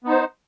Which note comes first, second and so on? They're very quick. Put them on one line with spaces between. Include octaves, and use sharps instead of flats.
B3 D#4 C5